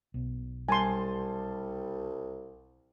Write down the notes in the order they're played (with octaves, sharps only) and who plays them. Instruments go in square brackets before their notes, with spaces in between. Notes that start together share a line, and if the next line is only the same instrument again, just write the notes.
[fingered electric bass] B1
[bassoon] C2 [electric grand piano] G3 A5 [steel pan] G#5 C6